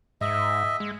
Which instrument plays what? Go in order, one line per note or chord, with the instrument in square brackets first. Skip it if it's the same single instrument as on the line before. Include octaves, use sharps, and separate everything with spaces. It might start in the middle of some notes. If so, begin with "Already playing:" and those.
[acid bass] G#2 [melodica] D#5 E5
[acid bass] G#3